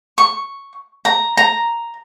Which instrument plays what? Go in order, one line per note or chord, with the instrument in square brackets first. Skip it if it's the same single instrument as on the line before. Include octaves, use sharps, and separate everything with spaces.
[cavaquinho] C#6
A#5
A#5